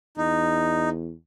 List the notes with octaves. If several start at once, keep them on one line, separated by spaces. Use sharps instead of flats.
E2 D#4